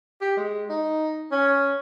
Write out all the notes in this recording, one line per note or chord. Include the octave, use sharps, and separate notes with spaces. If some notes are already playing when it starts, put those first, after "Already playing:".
G4
G#3
D#4
C#4